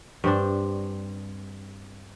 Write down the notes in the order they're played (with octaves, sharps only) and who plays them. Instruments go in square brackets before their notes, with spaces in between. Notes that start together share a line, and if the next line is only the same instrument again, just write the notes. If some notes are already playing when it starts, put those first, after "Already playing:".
[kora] G2 C4 D4